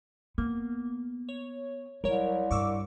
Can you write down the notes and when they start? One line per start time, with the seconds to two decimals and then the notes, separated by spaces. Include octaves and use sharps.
0.38 A#3 B3
1.29 C#5
2.04 C2 F#3 A#4 C#5
2.51 G2 C#6 D6 E6